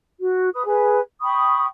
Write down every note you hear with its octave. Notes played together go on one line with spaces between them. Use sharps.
F#4
B4 D#6
G#4 B4
G5 B5 C#6 D#6